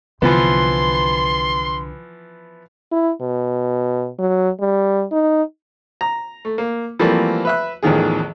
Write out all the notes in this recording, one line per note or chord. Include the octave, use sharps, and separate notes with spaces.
C2 D3 E3 F3 B3 C6
E4
B2
F#3
G3
D#4
A#5
A3
A#3
E3 F3 G3 A3 A#3 C4
B4 E5 F#6
A1 E2 D#3 F3 G#4